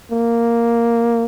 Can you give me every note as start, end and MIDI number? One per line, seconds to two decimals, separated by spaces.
0.12 1.25 58